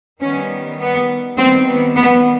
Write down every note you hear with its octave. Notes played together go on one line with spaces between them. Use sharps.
D#3 G3 B3 C#4
B3
D#3 G3 B3 C4
B3
B3